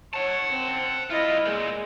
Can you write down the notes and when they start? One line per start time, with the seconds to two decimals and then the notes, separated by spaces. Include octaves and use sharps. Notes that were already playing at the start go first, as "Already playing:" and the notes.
0.13 C#5 F#5 A5
0.52 C4
1.10 C2 E4 F4 D#5
1.46 A#2 G#3